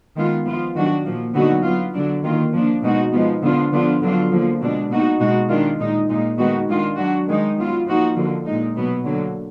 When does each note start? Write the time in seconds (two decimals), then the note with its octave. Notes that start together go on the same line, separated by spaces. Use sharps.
0.16 D#3 G#3 B3 F4
0.46 F3 B3 F4
0.76 D#3 F#3 D4 F#4
1.05 A#2 F3 A#3
1.35 D3 F#3 B3 D#4 F#4
1.64 F#3 B3 F4
1.94 D3 F#3 D4
2.24 D#3 A#3 F4
2.53 F3 A#3 D4
2.83 B2 G#3 D#4 F#4
3.13 F3 G#3 B3 D#4
3.42 D3 F3 B3 D4 F4
3.72 D3 F3 B3 D4 F4
4.01 D3 F#3 B3 D4 F4
4.31 D3 F3 A#3
4.61 B2 G#3 D4
4.90 B2 A#3 D#4 F#4
5.20 B2 G#3 D#4 F#4
5.49 D#3 G#3 D4 F4
5.79 A#2 G#3 D#4
6.09 A#2 G#3 D#4
6.38 D#3 G#3 B3 D#4 F#4
6.68 D#3 G#3 D4 F4
6.98 F#3 D4 F#4
7.28 D#3 G#3 D#4
7.57 F#3 B3 F4
7.86 F3 A#3 D#4 F#4
8.16 D3 F3 A#3
8.46 A#2 G#3 D#4
8.76 B2 F#3 B3
9.05 D3 F#3 A#3